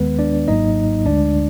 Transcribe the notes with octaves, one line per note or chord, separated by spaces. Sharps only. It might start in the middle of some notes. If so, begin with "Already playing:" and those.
Already playing: D#2 D#3 G#3 B3 B4
D4 D5
G#1 G#2 F#3 A#3 D#4 D#5
D2 D3 G#3 D4 D5